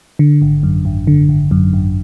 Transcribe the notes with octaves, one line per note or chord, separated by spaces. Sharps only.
D3
G#1
F#2
G#1
D3
G#1
F#2
G#1